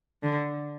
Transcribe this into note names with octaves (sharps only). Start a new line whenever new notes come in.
D3